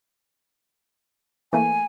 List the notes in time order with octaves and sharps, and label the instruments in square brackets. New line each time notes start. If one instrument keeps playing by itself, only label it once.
[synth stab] E3 A3 A#3 [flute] G#5